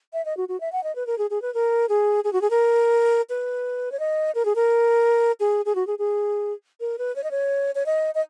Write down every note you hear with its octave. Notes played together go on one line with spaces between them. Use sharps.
E5
D#5
F#4
F#4
E5
F#5
D#5
B4
A#4
G#4
G#4
B4
A#4
G#4
G#4
F#4
G#4
A#4
B4
C#5
D#5
A#4
G#4
A#4
G#4
G#4
F#4
G#4
G#4
A#4
B4
C#5
D#5
C#5
C#5
D#5
D#5